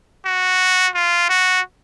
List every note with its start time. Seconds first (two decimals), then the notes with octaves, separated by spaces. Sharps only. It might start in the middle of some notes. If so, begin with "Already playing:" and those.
0.26 F#4
0.95 F4
1.30 F#4